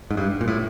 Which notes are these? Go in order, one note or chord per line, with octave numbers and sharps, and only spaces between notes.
G#2
G2
A#2
A2